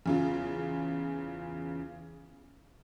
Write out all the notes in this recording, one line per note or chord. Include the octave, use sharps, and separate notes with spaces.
E2 C#3 F4